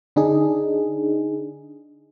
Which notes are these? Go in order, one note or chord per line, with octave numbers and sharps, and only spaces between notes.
D3 D4 D#4 G#4